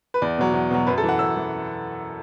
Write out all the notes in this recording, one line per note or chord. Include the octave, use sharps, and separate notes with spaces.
B4
E2 D5
B2 F#3
E2
B2 F#3
F#2 B4
A4
E3
F#5
F#2 E6
E3